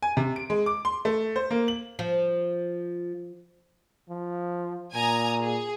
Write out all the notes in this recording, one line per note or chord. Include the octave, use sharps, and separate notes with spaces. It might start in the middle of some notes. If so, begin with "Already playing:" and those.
G#5
C3
D7
G#3
D6
C6
A3
C5
A#3
F#7
F3
F3
A#2 G#5 A#5 D#6
G#4